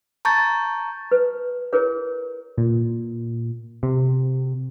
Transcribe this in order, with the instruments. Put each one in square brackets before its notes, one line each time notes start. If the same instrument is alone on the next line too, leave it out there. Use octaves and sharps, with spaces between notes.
[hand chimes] A5 A#5 C#6 G6 A6
[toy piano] B4
E4 G#4 A#4 B4 C#5
[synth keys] A#2
C3